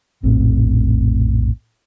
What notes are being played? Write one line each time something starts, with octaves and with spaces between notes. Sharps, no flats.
F1 A#1 A2 C4